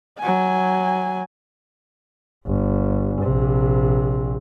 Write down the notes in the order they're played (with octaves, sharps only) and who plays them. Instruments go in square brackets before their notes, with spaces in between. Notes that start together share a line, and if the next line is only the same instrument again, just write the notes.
[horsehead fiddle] F#3 G#5
[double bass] G1
A#1 C3